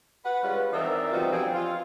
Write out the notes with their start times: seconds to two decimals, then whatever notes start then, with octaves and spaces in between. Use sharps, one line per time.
0.24 B4 F#5
0.43 G3 G#3 C#4 F4 B4
0.73 E3 C4 D#4 A#4 D5 E5
1.13 G3 B3 C4 D#4 F4 F#4
1.32 F3 C4 D4 G4 G#4
1.53 F4